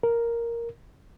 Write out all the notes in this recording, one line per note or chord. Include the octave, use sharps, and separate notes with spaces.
A#4